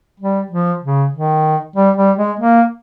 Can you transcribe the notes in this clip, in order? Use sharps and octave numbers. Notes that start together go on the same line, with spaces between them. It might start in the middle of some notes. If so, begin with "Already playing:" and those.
G3
F3
C#3
D#3
G3
G3
G#3
A#3